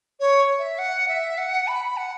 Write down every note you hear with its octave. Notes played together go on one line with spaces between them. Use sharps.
C#5
E5
F#5
E5
F#5
B5
F#5